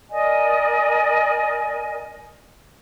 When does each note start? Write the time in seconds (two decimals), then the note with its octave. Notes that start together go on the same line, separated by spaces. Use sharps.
0.11 A#4 D5 D#5 G#5